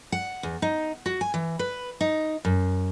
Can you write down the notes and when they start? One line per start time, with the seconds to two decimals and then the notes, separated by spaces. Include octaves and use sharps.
0.12 F#5
0.43 E2
0.62 D#4
1.06 F#4
1.21 G#5
1.34 E3
1.59 B4
2.01 D#4
2.45 F#2